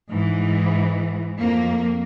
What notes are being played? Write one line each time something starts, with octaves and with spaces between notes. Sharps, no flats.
G#2 E3
F2 A#3